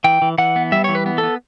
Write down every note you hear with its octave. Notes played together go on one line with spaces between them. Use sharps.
E3 G5
E3
E3 F#5
B3
G3 E5
E3 C#5
B4
B3
A4
B3